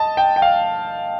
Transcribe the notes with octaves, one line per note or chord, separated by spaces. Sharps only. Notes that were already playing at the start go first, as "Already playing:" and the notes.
Already playing: D#5 A5
G5
G5
F5